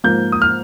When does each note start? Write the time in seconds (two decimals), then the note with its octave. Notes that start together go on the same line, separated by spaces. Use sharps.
0.04 G#2 F3 A#3 G6
0.32 D#6
0.42 F6